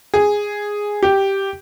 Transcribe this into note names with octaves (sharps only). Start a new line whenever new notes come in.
G#4
G4